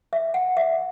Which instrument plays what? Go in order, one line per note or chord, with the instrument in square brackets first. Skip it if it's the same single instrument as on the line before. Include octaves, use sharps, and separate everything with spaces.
[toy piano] E5
F#5
E5